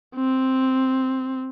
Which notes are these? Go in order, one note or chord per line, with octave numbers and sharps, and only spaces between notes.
C4